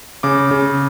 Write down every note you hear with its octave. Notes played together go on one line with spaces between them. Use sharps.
C#3 D6
C#3